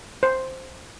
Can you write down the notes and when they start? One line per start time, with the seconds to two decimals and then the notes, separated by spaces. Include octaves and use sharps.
0.23 C5